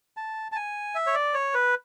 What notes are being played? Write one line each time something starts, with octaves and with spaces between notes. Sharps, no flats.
A5
A5
G#5
E5
C#5
D5
C#5
B4